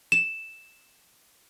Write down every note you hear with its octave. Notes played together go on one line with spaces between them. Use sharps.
E7